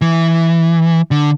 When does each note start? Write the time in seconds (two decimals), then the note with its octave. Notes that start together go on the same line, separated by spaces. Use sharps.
0.01 E3
1.11 D3